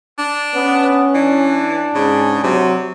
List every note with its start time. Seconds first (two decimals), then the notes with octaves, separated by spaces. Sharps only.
0.18 D4
0.55 B3 C#4
1.14 E3 D4
1.95 G#2 C#3
2.44 C3 F#3